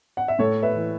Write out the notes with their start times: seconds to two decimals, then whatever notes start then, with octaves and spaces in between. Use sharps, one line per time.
0.17 F#5
0.28 E5
0.39 A2 A4 C#5
0.63 B4 E5
0.75 E3